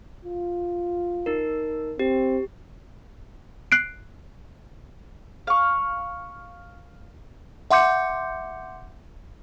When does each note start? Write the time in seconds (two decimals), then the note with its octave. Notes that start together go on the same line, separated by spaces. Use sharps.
0.25 F4
1.26 D#4 A#4
1.99 C4 G4
3.72 F#6 C7 D7
5.47 F5 C#6
7.71 E5 F#5 C6 D6 G6 C#7